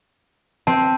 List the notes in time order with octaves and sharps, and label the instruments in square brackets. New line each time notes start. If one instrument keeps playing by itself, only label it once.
[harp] C4 [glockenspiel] A5